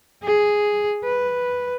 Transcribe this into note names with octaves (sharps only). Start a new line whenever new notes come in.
G#4
B4